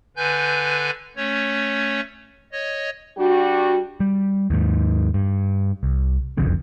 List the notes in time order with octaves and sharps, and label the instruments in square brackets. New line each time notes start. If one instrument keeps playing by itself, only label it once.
[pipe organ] D3 B4 G#5 G6
A3 C#4 C#5
C#5 D#5
[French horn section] G3 D4 F#4
[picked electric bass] G3
D#2 G#2
G2
C2
F#1 C2 F2 D3